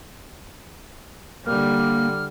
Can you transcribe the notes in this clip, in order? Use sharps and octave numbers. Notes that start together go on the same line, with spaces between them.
D3 G3 A#3 F6